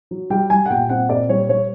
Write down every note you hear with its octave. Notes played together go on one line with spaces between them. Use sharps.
F#3
G3 G5
G3 G#5
F#5
A#2 G5
C4 F#5
A#2 D5
G3 C#5
G3 C#5